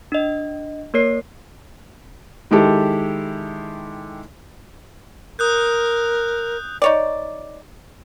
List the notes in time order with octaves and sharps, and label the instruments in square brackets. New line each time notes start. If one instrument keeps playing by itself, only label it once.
[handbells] D4 D#5
A#3 A#4 C#5 C7
[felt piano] D#3 G#3 E4 G4 A4
[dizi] A#4 [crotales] D#6 F#6 G6
[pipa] D#4 C#5 D5